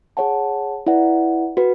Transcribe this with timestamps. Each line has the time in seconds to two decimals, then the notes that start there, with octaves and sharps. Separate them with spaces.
0.17 G#4 C#5 F#5 A5
0.86 E4 B4 D5 F#5
1.57 F#4 B4